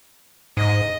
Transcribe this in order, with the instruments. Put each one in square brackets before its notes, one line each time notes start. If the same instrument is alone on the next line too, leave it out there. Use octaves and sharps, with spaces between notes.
[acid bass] G#2 [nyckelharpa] D#5